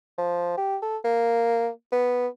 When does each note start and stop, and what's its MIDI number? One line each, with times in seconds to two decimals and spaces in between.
0.18 0.57 53
0.57 0.77 67
0.83 0.97 69
1.04 1.69 58
1.92 2.28 59